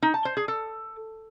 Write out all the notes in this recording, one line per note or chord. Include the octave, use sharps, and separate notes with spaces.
D#4
A5
C5
G#4
A4